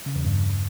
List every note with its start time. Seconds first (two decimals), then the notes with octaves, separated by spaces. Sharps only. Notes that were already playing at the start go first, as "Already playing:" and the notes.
0.06 C#3
0.15 E2
0.25 G2